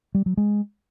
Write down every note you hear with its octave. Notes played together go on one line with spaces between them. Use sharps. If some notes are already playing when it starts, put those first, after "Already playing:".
G3
F#3
G#3